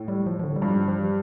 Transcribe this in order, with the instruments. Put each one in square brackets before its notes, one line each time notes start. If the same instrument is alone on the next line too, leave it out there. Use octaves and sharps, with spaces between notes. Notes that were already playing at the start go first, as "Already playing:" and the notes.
Already playing: [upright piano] A2
[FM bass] G3
F3
F3
D3
G3
[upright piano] G2 [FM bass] F3
[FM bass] F3
G3